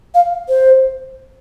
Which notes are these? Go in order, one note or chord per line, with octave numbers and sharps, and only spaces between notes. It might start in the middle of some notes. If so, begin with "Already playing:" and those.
F5
C5